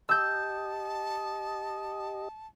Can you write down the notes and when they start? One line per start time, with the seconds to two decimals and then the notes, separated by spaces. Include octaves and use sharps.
0.09 G4 D#5 A5 E6 G6